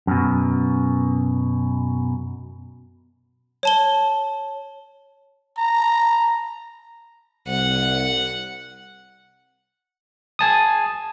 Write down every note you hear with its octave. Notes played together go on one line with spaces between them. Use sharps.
F#2 B2
C#5 A5 G7
A#5
C2 F#5
G#5 A5 D#6